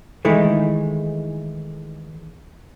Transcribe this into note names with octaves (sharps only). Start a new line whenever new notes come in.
D#3 E3 G#3 A3